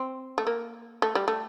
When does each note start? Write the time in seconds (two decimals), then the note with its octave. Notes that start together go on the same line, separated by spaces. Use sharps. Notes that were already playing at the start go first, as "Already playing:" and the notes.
Already playing: C4
0.38 A3
0.47 A#3
1.02 A3
1.15 G3
1.28 A3